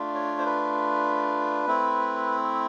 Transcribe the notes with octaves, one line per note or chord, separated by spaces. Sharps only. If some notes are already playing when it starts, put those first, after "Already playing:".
Already playing: A3 D4 F4
C#5
C5
B4
A3 C4 E4